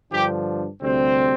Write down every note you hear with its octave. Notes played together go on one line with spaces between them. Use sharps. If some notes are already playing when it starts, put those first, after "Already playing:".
G2 D3 F3 D4 G4
D2 C3 G3 C4